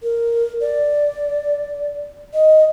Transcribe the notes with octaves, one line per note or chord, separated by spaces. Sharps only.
A#4
D5
D#5